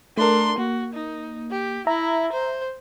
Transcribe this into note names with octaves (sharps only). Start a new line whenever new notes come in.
A3 D4 A#4 C6
A#3 F#4
D#4
G4
E4 E5 A#5
C5